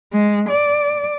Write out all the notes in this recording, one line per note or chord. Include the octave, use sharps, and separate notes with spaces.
G#3
D5